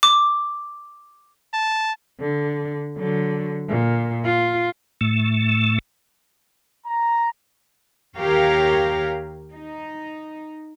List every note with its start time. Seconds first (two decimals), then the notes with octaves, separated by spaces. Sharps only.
0.03 D6
1.53 A5
2.20 D3
2.98 D3 F#3
3.69 A#2
4.24 F4
5.01 A2 A3
6.86 A#5
8.17 D#2 G4 A#4 C#5 F5
9.52 D#4